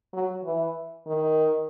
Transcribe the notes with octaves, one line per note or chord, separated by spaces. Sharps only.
F#3
E3
D#3